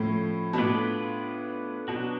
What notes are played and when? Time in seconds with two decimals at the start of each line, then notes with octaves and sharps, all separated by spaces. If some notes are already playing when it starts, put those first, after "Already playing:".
Already playing: A2 F3 A3 C#4
0.53 B2
0.58 A2 B3 D4 F4 B4 D5
1.88 B2 F#3 B3 D4 F#4